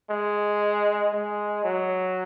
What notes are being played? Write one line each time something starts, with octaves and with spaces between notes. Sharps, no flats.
G#3
G#3
F#3